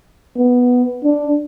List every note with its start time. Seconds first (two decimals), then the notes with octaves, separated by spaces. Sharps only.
0.38 B3
1.04 D4